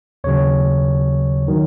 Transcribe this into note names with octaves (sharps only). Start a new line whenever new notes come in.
D#2 C#3 F#3 C#5
D#3 F#3